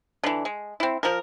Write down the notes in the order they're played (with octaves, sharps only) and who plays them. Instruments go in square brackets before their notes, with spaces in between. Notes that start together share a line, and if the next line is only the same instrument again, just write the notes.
[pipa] D3 E3
G#3
C4 E4
F3 A#4